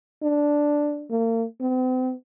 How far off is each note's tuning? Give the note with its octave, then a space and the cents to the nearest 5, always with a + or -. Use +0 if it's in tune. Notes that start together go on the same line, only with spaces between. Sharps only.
D4 +0
A#3 -40
C4 -40